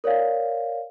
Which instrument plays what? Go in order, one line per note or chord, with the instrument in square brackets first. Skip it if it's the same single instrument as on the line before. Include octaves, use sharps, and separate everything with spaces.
[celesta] A#4 C#5 D5 F5